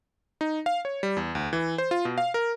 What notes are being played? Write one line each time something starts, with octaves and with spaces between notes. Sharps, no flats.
D#4
F5
C#5
G3
E2
D2
E3
C5
F4
B2
F5
A#4